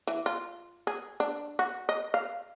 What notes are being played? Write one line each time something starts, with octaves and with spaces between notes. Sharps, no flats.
E3
F4
G#4
D4
F#4
D#5
F5